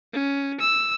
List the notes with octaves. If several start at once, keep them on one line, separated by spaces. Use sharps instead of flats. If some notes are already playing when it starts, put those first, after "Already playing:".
C#4
E6